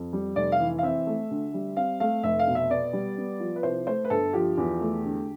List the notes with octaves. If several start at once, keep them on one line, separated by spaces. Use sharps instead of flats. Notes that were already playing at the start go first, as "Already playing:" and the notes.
Already playing: F2
G3
F1 D5
F5
E3
F5
C4 E5
A3
D2
G3
C4 F5
A3 F5
F1 E5
F5
B2
E5
B3 D5
G3
B3
F3
B4
C2 C5
A3 C5
B4
G1 A4
F3 G4
E2
A3
D2